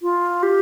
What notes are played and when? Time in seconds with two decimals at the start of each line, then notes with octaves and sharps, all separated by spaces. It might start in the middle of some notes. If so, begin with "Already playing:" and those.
0.02 F4
0.43 G4